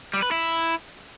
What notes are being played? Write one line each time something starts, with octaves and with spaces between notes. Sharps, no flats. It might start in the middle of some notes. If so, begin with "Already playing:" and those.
G3
B4
E4